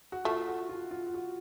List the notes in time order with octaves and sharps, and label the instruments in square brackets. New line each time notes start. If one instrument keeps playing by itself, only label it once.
[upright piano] F#4
[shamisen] A3 [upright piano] F4
[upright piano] F#4
F4
F4
F4
F#4